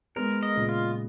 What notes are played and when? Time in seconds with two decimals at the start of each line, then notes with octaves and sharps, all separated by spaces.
0.16 G#3 B3 A#4
0.43 D#5
0.55 A#2 C#3
0.69 F4